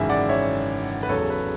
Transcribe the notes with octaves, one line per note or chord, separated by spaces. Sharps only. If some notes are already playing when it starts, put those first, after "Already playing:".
Already playing: G#1 F#2 C#3 E3 G#3 E5 G#5
D5 F#5
C#5 E5
B4
E2 C#3 F#3 C#4 A4 C#5
B4